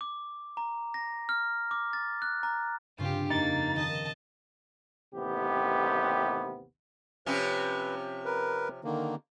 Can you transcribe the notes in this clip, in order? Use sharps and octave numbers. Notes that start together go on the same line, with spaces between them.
D6
A#5
A#6
F6
D6
A6
F#6
A#5
G2 C#3 C4 F4 G4
F2 A#3 D#4 A6 D7
D#3 D#5 A5
A1 D#2 C3 B3 G4
C3 F3 C#4 B4
A#4 B4
D3 D#3 A#3